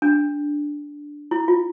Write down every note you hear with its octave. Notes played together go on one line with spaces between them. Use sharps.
D4
E4
F4